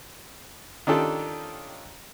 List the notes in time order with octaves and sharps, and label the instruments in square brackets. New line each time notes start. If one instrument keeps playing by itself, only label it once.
[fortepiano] D#3 C#4 D4 F4 G4 A4